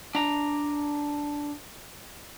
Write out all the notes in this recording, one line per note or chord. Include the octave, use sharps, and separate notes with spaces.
D4 A#5